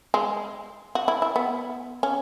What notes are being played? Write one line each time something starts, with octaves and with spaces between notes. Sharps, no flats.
G#3
F#4
E4
E4
B3
C#4